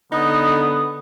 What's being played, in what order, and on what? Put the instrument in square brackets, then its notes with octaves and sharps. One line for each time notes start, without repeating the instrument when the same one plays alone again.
[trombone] D3 [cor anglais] B3 [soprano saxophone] D#4 [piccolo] D#6